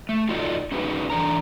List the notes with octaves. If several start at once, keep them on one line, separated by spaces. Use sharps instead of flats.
A3
D#4 F4 F#4 A4 D5 D#5
C#4 D#4 F#4 G#4 B4
E3 D4 A4 A#5